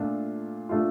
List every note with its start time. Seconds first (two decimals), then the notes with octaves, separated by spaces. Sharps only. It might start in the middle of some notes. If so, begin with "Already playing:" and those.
Already playing: A#2 A3 D4 F4
0.69 A#2 A3 D4 F4